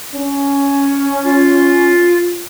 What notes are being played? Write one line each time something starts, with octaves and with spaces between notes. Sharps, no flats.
C#4
F4